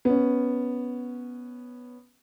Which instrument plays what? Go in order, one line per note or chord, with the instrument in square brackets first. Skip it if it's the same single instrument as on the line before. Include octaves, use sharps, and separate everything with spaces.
[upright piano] B3 C#4